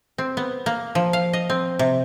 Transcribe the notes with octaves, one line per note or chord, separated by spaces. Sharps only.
C4
B3
A#3
F3
F5
D#5
C4
C3